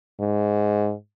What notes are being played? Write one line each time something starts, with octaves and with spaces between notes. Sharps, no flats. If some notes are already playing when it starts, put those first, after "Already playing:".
G#2